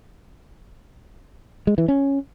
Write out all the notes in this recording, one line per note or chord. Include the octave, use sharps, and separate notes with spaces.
G#3
E3
C#4